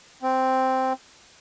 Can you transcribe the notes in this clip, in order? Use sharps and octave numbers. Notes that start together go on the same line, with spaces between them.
C4